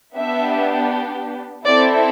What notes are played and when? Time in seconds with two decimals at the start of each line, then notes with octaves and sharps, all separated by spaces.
0.15 B3 D4 G4 E5
1.65 C4 E4 A4 D5